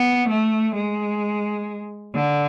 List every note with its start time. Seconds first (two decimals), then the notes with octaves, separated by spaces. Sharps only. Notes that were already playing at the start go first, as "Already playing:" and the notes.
Already playing: B3
0.29 A3
0.76 G#3
2.15 D3